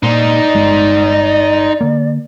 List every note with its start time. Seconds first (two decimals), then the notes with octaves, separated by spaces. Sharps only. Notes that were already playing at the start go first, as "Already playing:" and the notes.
0.03 A#2 D#4 C5 D5
0.54 G1 G#3
1.81 D3 A#3